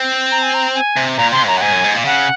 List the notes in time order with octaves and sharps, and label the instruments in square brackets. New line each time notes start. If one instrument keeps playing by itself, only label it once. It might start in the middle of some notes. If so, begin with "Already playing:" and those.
Already playing: [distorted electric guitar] C4
[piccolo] A#5
G#5
A#5
G#5
[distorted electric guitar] C3
[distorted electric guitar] A#2 [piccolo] A#5
[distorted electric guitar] C3 [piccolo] C6
[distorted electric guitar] F#2 [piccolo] A#5
[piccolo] F#5
[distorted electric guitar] G#2 [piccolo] G#5
[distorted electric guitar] F#2
G#2
A#2
[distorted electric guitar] C#3 [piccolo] F#5